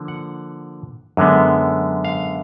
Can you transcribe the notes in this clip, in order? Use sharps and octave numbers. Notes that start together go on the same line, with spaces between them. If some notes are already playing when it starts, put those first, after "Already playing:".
Already playing: D3 F3 A#3
F#5
F#2 D3 G#3 B3
F5